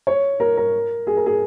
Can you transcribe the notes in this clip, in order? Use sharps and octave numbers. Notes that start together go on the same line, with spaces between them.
C#5
A#4
A#4
G#4
A#4
G#4